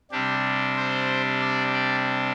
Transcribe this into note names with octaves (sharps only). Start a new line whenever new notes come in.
C3 G3 D4 G4
C5
D5
D5